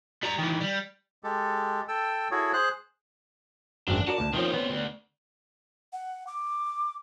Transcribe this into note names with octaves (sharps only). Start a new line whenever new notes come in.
G3 A#5
D#3 E3
G3
G#3 G4 A4
A4 G5 E6
E4 F#4 G#4 A4 C#5
G#4 C5 F#6
G#1 F#2 D4
F#4 A#4 D5 A5
D2
D#3 F3 C4 C#4
B3
D2
F#5
D6